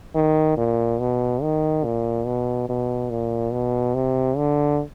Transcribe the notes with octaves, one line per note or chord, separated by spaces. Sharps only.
D#3
A#2
B2
D#3
A#2
B2
B2
A#2
B2
C3
D3